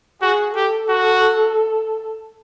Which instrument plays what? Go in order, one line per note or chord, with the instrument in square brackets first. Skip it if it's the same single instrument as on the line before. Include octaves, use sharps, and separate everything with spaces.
[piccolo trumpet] F#4 [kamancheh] G#4
[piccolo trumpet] G4 [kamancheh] A4
[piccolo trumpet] F#4